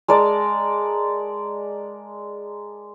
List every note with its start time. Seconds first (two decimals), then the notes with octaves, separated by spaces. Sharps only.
0.08 G#3 A#4 D5 A5